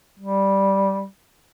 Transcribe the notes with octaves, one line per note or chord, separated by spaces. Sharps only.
G3